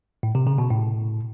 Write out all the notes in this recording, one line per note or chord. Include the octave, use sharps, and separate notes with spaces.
A2
C3
C#3
B2
A2